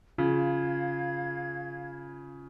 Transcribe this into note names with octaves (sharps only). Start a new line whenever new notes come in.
C#3 F4 F5 G#6